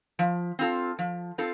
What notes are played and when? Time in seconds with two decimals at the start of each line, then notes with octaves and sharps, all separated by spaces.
0.19 F3
0.59 C4 F4 A4
0.99 F3
1.38 C4 F4 A4